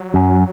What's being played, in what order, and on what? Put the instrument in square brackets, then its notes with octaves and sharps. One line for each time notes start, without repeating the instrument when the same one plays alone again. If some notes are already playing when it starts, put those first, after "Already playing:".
Already playing: [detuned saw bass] F#3
[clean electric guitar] F#2